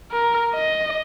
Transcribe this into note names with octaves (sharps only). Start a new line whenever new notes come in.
A#4
D#5